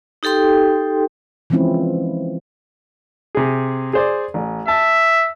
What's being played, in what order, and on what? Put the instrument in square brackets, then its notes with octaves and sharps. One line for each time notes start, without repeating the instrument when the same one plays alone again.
[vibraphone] D#4 G4 A4 G5 C6
[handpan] E3 F3 G#3 C4 C#4 E4
[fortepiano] C3 G#4
G#4 C5 D5
A1
[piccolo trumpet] E5 [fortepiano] A5